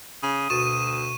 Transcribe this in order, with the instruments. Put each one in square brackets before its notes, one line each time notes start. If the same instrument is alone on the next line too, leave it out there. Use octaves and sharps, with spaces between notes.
[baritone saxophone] C#3 [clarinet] D#6
[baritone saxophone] D2 [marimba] B2 F#4 A6 [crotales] C#6 D#7 E7